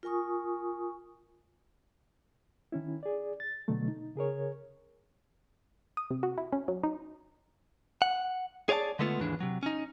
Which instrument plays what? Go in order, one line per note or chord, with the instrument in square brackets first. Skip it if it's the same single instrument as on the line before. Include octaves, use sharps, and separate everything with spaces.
[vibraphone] F4 A#4 G#5 C#6 D#6
[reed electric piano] D#3 C#4 E4
G#4 D5
A6
B2 D3 F#3 A3
D#4
C#3 G#4 A#4 C#5
[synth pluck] D#6
C3
F#4
E4
C#4
F#3
D#4
[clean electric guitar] F#5
G#4 C#5 D5 F5 A5
D3 G#3 A3 B3 D#4 F4
D#2 G#2 E3 G#3 D4
C3 F#3
C#4 D#4